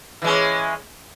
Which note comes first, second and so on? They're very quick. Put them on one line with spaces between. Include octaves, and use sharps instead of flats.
E3 G#3 C#4